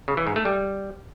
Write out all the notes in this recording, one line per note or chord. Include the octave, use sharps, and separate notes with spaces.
C#3
E3
G#2
A3
G3